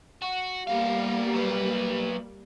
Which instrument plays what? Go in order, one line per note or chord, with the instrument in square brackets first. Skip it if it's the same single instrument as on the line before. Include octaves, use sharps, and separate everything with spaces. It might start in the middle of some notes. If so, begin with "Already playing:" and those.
[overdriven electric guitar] F#4
[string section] G3 A#3 [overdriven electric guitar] B3 F5
[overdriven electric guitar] F#3 B4